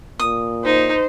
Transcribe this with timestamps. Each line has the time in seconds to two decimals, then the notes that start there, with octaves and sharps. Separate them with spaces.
0.19 A#2 D#6
0.65 D#4 C5